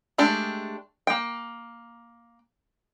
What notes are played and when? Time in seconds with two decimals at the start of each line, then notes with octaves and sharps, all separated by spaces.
0.18 G#3 A3 D4 G4
1.07 A#3 G5